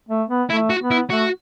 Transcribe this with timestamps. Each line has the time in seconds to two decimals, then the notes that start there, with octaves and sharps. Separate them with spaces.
0.09 A3
0.29 B3
0.49 A3 E4
0.70 F#4
0.80 B3
0.91 E4
1.10 A3 F#4